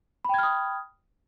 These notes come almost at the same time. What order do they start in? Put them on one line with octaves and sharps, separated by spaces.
B5 G5 G#6 F6 D#6